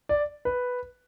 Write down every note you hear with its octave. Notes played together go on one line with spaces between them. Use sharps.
D5
B4